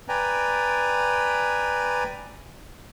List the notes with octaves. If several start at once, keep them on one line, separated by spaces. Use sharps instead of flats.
B4 D5 G5 G#5 A#5